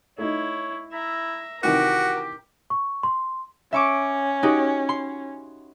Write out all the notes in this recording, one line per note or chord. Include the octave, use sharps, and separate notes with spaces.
A3 D#4 E4 C#5
E4 E5 A#5
C3 D#3 E3 F#4 G4 A#4
C#6
C6
C#4 E5 C#6 D6
D#4 F#4 G4
C6